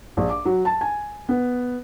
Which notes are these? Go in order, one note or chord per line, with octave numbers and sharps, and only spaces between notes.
A#1
D6
F#3
A5
G#5
B3